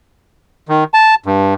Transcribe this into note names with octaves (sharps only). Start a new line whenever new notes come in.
D#3
A5
G2